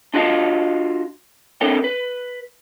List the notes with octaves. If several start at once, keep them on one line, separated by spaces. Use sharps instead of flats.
D4 F4 F#4 D#5 F5 A5
C4 D4 A4 A#4 C#5 G5
B4